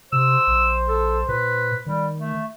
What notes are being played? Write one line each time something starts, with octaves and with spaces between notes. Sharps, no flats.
C3 C5 E6
A#1
A4
A#2 B4
D#3 G3
A3